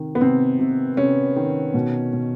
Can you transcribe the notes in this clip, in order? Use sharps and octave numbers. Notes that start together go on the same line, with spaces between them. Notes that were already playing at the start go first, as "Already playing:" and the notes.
Already playing: C3 D#3
B3
C3 C4
C3
C3 C#4
D#3
B2
B2